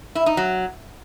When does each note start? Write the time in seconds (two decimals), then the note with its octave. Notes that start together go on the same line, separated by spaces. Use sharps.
0.15 E4
0.26 D#4
0.37 F#3